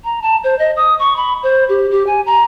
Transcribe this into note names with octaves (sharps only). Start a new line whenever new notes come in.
A#5
A5
C5
D#5
D#6
C#6
B5
C5
G4
G4
G#5
A#5